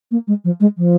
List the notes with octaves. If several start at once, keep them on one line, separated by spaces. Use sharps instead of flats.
A#3
G#3
F3
G#3
F3